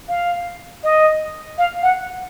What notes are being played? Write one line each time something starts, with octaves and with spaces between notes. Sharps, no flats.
F5
D#5
F5
F#5